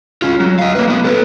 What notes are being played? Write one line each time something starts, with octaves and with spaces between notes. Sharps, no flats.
C#4 F4
F#3
D#5 F5
A#3 B4
F#3 B3
A4 B4